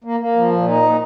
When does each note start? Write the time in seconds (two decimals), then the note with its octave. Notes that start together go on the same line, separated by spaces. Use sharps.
0.04 A#3
0.20 A#3
0.36 F3
0.51 A#2
0.67 D#4
0.83 A#2